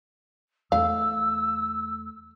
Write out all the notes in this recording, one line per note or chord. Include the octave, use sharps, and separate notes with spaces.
E2 A3 F5 E6